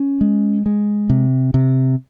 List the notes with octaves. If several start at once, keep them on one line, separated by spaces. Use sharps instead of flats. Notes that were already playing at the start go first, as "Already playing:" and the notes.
Already playing: C#4
G#3
G#3
C3
C3